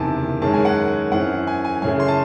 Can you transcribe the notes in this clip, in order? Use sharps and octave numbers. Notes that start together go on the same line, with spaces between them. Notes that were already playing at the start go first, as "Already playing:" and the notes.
Already playing: F#1 E2 C3 D#3 G#5 A5
F#2 D#3 G#3 C#4 A5
G#5
F#5
F#2 E3 C4 F#5
G#5
G#5
F#2 C#3 E3 A3 G#5
C6
A5